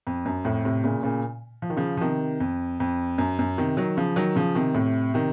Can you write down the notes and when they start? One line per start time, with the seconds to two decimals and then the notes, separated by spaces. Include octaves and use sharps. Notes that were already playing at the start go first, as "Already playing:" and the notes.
0.07 F2
0.26 F#2
0.45 F2 A2
0.65 A2 C3
0.84 A#2 C#3
1.03 A#2 C#3
1.62 F3
1.70 D#3
1.77 C#3 F3
1.97 F3
2.01 C3 D#3
2.40 F2
2.80 F2
3.18 F#2
3.39 F#2
3.58 C3 D#3
3.77 D#3 F#3
3.97 C#3 F3
4.16 D#3 F#3
4.36 C#3 F3
4.55 C3 D#3
4.75 A2 C3
5.14 C3 D#3